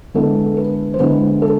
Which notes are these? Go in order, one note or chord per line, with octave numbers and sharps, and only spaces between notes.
D3 G#3 B3 E4 A4
B4
C5
D3 G#3 B3 E4 B4
A4